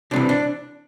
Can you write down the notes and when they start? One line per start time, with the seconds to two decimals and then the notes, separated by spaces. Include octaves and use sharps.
0.11 C2 C3 E3 D4
0.29 D4